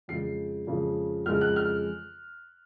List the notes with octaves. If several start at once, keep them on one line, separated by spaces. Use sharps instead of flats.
F2 C#3 G#3 C7
F2 C#3 G#3
F2 C#3 G#3 F6
F#6
F6